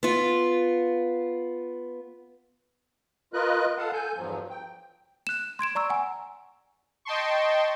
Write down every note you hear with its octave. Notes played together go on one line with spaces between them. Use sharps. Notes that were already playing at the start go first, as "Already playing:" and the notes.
B3 F4
F4 A#4 B4 D#5 F#6
A4 F5 F#5 A5
A4 G#5 G6
E2 G2 F3 F#3
G5
F#6 E7
C6 G#6 D7 E7
D5 A#5 C#6 E6
F#5 G#5
D#5 G5 A5 C6 C#6